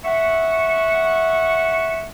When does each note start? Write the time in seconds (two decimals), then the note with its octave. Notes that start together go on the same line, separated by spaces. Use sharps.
0.05 E5 F#5 C#6